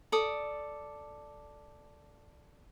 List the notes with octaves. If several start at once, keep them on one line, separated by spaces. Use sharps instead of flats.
A4 D5 D#6